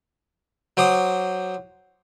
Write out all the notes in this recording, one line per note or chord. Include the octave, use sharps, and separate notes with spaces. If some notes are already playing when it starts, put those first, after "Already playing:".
F#3 C5 D6 D#6